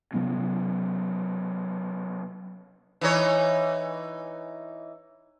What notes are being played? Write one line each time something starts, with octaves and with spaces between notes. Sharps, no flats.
C3 F#3 B3 C#4
E3 D#4 C#5